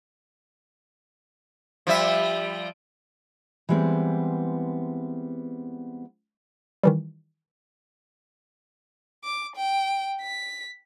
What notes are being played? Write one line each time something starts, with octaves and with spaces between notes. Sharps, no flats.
F3 G3 E5
E3 G3 G#3 B3 C4
D#3 E3 G3
D6
G5
B6